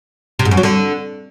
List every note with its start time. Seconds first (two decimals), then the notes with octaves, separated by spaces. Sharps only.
0.39 C3
0.45 G#2
0.51 F#2
0.57 F#3
0.63 D3